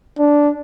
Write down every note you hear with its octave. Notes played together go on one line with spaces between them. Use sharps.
D4